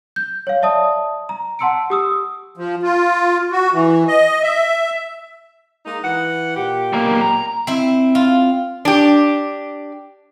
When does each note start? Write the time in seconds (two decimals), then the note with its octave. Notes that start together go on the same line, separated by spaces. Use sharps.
0.16 G6
0.47 C#5 F5
0.62 D5 E5 A5 D#6
1.29 A#5
1.59 F#5 A5 C6 E6 C#7 D7
1.90 G4 D#6 E6
2.57 F3
2.83 F4
3.51 F#4
3.73 E3
4.08 D#5
4.43 E5
5.85 G#3 A#3 D#4
6.03 E3 F#5
6.55 A#2 G4
6.93 B1 A#3
7.21 A#5
7.67 C4 E4
8.15 F4
8.85 D4 G4